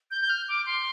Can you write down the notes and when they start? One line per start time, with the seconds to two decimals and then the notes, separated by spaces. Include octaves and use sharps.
0.11 G6
0.21 G6
0.29 F6
0.48 D6
0.66 C6